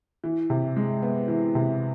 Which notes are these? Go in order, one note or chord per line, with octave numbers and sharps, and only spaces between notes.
E3
C3
G#3
B3
E3
C3